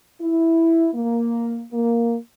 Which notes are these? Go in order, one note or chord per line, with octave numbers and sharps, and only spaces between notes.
E4
A#3
A#3